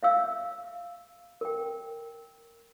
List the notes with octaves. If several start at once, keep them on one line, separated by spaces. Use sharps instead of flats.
E5 F5 E6
A#4 G5